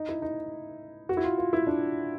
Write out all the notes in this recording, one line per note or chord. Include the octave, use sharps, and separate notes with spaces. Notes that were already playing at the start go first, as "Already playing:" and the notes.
Already playing: D#4
E4
D#4
F#4
E4
F4
F4
E4
D4